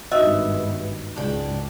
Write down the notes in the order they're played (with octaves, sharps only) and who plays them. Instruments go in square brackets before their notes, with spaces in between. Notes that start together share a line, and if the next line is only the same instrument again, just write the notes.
[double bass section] G#1 G2 B3 [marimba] D#4 F#4 [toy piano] D#5 [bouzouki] E5
[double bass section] C#2 G#2 C#3 [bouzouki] D4 G5